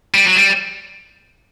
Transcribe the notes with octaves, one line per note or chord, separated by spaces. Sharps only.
G3
F#3
G3